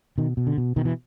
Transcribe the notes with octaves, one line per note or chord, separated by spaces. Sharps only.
B2 D#3
B2
D3
B2
B2 D#3
E3